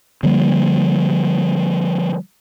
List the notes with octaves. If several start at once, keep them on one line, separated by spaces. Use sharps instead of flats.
D3 F3 G3 A#3